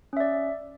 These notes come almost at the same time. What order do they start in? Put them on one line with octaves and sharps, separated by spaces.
C#4 E5 D5